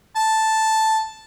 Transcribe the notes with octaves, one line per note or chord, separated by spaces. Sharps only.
A5